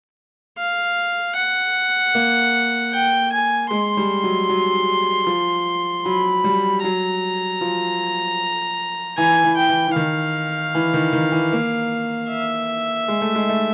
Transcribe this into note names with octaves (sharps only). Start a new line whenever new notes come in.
F5
F#5
A#3
G5
G#5
G#3 C6
G3
F#3
F#3
F3
F#3 B5
G3
F#3 A#5
F3
E3 G#5
E3
G5
E3
E3
D#3 F5
E3
D#3
D#3
E3
A#3
E5
G#3
A3
G#3
A3